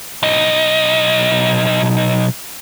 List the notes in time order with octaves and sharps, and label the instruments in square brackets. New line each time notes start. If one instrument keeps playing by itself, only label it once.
[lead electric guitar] B1 D#5